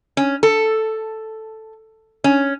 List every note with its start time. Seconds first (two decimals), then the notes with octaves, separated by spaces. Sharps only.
0.17 C#4
0.43 A4
2.24 C#4